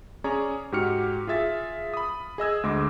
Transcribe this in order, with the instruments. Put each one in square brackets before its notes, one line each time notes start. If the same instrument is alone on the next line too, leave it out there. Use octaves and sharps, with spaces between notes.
[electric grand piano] C#4 G#4 C#5 D5 A#5
G#2 F#4 G4 F6 C#7
F4 G#4 E5 A6
B5 D#6
G#4 D#5 E6 G#6
D2 G#3 D#5 C6 D6